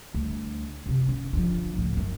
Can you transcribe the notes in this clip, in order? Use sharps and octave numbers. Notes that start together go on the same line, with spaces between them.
D2 G3
F#2 C3
C#4
D3 F3
C#2 A2
F#2